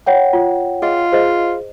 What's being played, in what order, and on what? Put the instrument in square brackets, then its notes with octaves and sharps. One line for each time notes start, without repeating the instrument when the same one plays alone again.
[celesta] C#5 F#5 G5
[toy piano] F4
[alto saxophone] F4 [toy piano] G#4 D#5
[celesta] G#4 [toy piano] C5 D#5